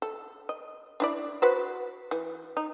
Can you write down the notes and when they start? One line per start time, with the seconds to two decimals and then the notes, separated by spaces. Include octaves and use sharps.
0.02 A4
0.49 D#5
1.00 D4 E4 D5
1.42 F#4 B4 C5
2.11 E3
2.57 D#4